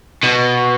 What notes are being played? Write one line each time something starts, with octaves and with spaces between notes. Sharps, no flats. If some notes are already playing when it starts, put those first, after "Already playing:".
B2